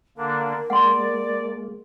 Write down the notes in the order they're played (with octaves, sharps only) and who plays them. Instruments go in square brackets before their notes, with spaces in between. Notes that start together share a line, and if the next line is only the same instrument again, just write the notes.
[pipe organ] D3 A#3 D4 [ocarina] A#4
[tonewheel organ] G#3 A#3 [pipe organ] D5 [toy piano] F#5 C6